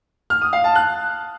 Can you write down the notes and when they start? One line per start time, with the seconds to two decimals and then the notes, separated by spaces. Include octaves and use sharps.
0.30 F6
0.42 D#6
0.53 F5
0.64 A5
0.75 F#6